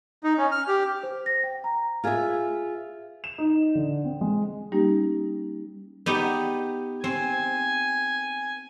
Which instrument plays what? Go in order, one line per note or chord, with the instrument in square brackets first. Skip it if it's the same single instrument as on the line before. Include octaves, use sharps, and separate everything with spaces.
[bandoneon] D#4
C#4
F6
G4
[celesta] C5
A#6
G5
A#5
[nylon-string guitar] F4 G#4 B4 D5 E5
[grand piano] E7
D#4
D3
C4
G#3
[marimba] G3 A#3 C#4 D#4 G4
[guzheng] B3 D#4 G4
[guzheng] C4 [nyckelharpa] G#5